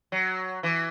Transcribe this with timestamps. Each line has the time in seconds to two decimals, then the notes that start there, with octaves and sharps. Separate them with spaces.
0.12 F#3
0.63 E3